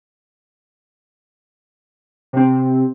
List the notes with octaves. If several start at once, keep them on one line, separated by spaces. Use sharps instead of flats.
C3 C4